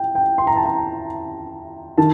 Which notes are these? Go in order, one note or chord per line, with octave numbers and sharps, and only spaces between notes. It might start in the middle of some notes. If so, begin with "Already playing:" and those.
Already playing: G5
G5
C6
A#5
A5
A#5
D#3 A5